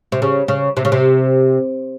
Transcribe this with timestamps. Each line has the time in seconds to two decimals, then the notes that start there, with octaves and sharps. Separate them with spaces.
0.12 C3
0.22 C#3
0.48 C#3
0.77 C3
0.85 C#3
0.92 C3